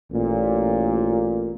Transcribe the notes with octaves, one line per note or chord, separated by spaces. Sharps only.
A1 A#2